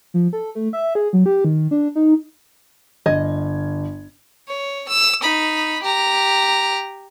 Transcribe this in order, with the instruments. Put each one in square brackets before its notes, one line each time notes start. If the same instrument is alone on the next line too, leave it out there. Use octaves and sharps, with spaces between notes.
[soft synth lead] F3
A4
A3
E5
G#4
F#3
G4
D#3
D4
D#4
[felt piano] G1 G#6 [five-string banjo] D#5
[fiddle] C#5
E6
D#4 B5
G4 A#5